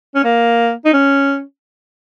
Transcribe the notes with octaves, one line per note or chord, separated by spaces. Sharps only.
C#4
A#3
D#4
C#4